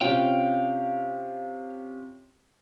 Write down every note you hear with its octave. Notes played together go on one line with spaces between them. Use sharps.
C3 C#4 F4 F5 G5